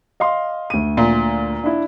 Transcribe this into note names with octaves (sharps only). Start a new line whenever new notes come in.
D#5 F5 C6
D2 D#7
A#2
D4 E4